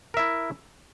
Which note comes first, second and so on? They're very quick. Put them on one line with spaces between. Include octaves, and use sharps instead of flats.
A#4 E5 E4